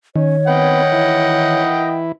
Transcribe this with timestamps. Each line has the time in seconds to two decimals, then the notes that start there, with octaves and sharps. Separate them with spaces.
0.16 D#3 C#4 C#5
0.47 B3 C4 B4 D#5 F#5 G5
0.92 E3 E4